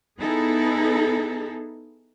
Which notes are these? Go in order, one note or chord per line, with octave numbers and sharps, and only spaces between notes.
B3 D#4 E4 G#4 A4